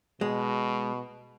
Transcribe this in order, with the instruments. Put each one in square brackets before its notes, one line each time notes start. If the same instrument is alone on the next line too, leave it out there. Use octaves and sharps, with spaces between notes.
[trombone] B2 [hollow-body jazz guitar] G#3